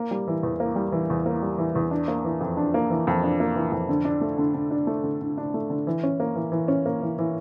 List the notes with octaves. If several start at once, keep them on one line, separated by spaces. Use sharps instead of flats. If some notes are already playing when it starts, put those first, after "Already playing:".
Already playing: A#3
G3
E3
E2
A#3
G3
E3
E2
A#3
G3
E3
E2
D4
A#3
E3
F2
D4
A#3
E3
F2
D4
A#3
E3
F2
D3
D4
A3
D3
D3
D4
A3
D3
D3
D4
A3
D3
E3
C#4
A#3
E3
E3
C#4
A#3
E3
E3